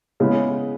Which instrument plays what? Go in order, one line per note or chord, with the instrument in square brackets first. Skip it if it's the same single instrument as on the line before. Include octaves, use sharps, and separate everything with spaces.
[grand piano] C#3 G#3 B3 E4